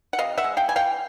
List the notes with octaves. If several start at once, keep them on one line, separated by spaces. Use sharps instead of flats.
F#5
C3 D#5 F5
E5 F#5
G#3
F5 G5
E3 G#5
F5 G5